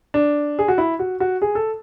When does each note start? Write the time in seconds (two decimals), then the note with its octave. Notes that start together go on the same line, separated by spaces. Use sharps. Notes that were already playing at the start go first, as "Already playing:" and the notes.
0.14 D4
0.59 G#4
0.68 F#4
0.78 E4
0.99 F#4
1.20 F#4
1.42 G#4
1.55 A4